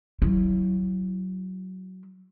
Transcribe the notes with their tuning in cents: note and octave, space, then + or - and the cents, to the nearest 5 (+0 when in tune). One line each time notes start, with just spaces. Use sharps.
F#3 +10 E4 +0